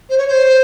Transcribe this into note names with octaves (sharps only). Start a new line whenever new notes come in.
C5
C#5
C5